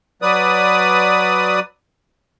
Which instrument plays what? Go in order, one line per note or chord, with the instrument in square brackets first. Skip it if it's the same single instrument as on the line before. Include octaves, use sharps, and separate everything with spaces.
[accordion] F#3 B4 D5 D#6